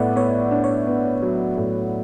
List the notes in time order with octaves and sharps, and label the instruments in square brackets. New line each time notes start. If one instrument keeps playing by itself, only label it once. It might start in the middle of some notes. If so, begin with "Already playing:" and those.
Already playing: [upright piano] A2 B3 [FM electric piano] D5 E5 F#5
[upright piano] B3 [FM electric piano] C#5
[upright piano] D4
[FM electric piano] C#5
[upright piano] B3
F#3
A2